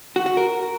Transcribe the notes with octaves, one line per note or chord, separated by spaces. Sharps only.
F#4
F#4
A#4